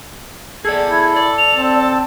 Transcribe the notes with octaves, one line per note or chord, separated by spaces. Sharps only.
G#4 A4 D5 G#6
E4
D5
F7
C4 A5